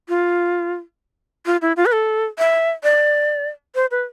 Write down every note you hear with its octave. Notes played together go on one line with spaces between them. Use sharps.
F4
F4
E4
F4
B4
A4
E5
D5
C5
B4